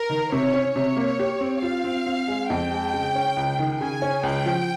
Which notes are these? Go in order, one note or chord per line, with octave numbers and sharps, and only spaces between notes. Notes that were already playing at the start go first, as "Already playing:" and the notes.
Already playing: A#4
D#3
C3 C#5
C#4
C3 C#5
A#3
G4
C4
F4 F5
C4
C4
G#3
F2 G5
G#3
C#3
C#4
C#2
D#3
C#3 G#5
C#4
C#2 G5
F3